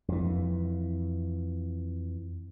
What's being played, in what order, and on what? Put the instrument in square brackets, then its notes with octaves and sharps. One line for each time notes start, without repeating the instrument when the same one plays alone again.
[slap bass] F2 E3